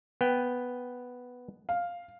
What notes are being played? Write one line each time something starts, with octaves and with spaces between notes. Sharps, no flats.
B3 G5
F5